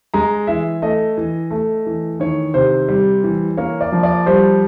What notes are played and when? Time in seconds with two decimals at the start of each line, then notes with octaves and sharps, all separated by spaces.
0.14 G#3 A#5
0.47 E3 E5
0.82 A3 D#5
1.17 E3
1.51 A3
1.86 E3
2.20 D#3 C#5
2.54 C3 C5
2.88 G3
3.23 E3
3.57 A#3 C#5
3.81 D5
3.92 F3
4.03 D5
4.26 G3 C5